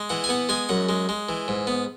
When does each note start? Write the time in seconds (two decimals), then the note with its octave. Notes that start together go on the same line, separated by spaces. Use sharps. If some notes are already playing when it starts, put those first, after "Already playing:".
Already playing: G#3
0.09 E3 F#5
0.24 G#5
0.29 B3 F#5
0.49 G#3 G#5
0.69 F#2 F#5
0.89 G#3
1.09 G#3
1.29 E3
1.48 G#2
1.67 B3